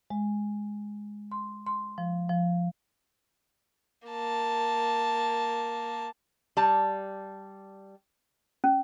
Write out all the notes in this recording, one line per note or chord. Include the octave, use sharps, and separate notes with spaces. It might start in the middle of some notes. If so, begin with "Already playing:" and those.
G#3
C6
C6
F3
F3
A#3 A5
G3 A5
C#4